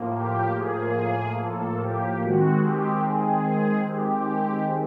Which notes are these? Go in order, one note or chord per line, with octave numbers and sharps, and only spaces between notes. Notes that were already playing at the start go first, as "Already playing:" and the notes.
Already playing: A2 F3 A#3
G4
G#4
A4
G4
D#3 G#3 C4 F#4
G4
G#4
G4